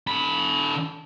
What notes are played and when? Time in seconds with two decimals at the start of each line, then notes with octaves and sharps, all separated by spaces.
0.07 D3 B5